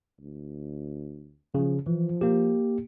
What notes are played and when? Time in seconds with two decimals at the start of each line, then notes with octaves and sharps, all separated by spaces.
0.20 D2
1.55 C#3 F3
1.87 E3 F3
2.21 A#3 G4